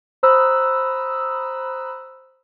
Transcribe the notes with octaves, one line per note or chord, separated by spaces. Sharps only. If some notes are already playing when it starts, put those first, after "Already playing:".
C5 A#5 B5 D#6 E6 F#6